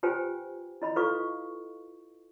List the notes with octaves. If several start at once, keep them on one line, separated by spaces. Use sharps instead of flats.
F4 G4 B4 C5 G5 G#5
E4 D#5 B5
E4 F4 A4 B4 F5 C#6